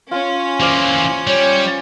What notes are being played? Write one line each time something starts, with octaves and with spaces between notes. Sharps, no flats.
C#4 F4
E3 A#3 C5 D5 F5
G3 C#5